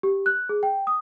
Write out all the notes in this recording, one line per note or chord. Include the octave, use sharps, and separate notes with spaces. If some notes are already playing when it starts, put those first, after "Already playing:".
G4
F#6
G#4
G5
D#6